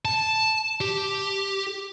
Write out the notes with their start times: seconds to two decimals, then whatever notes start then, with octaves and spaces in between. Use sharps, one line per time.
0.05 A5
0.81 G4